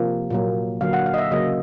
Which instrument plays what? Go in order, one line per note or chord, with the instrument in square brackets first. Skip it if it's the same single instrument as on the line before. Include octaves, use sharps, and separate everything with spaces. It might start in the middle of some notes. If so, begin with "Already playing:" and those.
Already playing: [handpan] C3 F3 A#3
A#2 F#3 A#3
D3 F#3 A#3 F5
F#5
F5
D#5
E5
C#3 F#3 A#3 D#5